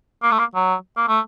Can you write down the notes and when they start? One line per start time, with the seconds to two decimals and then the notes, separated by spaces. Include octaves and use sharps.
0.23 A#3
0.32 A3
0.39 A#3
0.55 F#3
0.97 A#3
1.09 A3